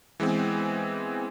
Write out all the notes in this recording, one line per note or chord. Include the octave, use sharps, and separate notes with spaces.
E3 G#3 B3 C4